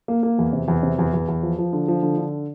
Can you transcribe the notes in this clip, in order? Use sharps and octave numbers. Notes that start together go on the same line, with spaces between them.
A#3
A#3
E2
C3
E2
C3
E2
E2
E2
F3
F3
D3
F3
D3
D3